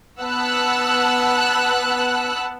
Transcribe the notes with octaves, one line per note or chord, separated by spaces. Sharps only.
B3 F#5 A5 E6 F#6